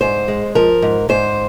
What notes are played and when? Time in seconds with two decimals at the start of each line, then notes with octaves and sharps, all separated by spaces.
0.01 G#2 C5
0.28 G#3
0.55 F3 A#4
0.82 G#2
1.09 G#2 C5